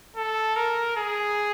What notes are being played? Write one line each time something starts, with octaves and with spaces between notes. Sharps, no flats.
A4
A#4
G#4